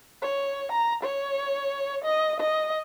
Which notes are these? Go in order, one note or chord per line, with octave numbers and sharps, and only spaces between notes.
C#5
A#5
C#5
D#5
D#5